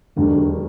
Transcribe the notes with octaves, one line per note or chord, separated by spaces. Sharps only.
E1 D#2 D3 D#3 F#3